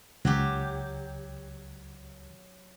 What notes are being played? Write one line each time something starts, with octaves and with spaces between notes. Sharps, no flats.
C#2 F#3 F#4 G4